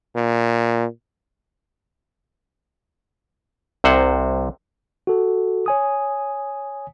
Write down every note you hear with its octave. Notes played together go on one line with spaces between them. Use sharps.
A#2
C2 C3 C5 F#5
F#4 A4
C#5 G#5 D#6